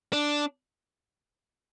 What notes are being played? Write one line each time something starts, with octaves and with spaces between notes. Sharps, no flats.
D4